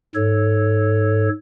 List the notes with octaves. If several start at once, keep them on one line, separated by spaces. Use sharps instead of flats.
G#2 A4 C#5